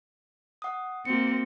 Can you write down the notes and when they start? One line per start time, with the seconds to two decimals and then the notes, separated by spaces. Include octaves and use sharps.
0.62 F#5 D#6
1.05 A#3 C4 F#4 C#7